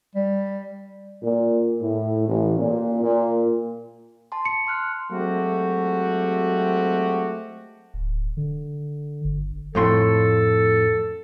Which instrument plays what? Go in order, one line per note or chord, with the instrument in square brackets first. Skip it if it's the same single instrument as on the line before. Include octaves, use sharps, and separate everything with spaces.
[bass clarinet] G3
[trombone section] A#2
A2
A1
A#2
A#2
[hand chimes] A5 C6
[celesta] C#7
[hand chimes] C6 F6 F#6
[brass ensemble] F#3 G#3 A3 C4 F#4 G4
[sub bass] D1
D3
G1
[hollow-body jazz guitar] F2 A2 C6 [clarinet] A4